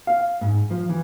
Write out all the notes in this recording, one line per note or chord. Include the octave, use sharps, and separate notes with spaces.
F5
G#2
F3
E3